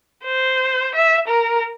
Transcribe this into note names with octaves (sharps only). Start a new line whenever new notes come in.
C5
E5
A#4